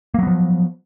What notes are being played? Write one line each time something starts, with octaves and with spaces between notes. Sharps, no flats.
F3 F#3 A#3 B3